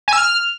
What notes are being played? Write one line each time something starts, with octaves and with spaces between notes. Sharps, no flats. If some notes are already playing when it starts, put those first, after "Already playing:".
G#5
E6
F6